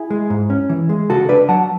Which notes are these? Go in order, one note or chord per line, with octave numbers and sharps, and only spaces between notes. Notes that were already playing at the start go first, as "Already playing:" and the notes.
Already playing: E4 G#4
G#3
G#2
C#4
E3
G#3
C#3 F#4 A4
D4 B4 D5
F#3 F#5 A5